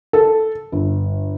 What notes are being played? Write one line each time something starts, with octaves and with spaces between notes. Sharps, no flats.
A4
G1